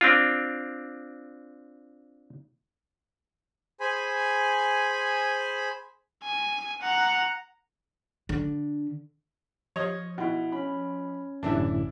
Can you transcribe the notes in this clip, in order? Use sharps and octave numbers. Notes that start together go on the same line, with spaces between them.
C4 D4 F4
G#4 C5 G#5 B5
G#5
F#5 A#5
D3
F3 C#5 D#5
B2 E4 F#5
C#4 B5
G1 F#2 A2 D3 E3 D4 E4